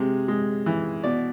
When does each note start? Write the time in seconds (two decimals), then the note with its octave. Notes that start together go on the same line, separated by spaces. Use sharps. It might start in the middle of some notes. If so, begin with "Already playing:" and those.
Already playing: C3 G#3
0.28 G#3
0.66 E3
1.04 B2 D5